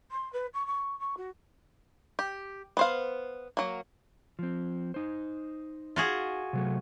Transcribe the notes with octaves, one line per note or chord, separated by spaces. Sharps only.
C6
B4
C#6
C#6
C#6
F#4
G4
B3 C5 F5
F#3 A#3
F3 C4
D#4 C5
F4 F#4 G#4
C3 F#3 A3